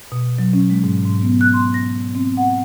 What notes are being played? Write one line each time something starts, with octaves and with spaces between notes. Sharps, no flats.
B2
F#3
C#4
G#3
G#2
G#2
B3
F#6
C6
A#6
C4
F#5